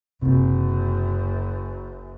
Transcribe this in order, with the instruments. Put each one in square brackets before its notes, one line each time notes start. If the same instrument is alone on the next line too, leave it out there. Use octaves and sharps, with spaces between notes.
[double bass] F#1 F#2 [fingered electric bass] C3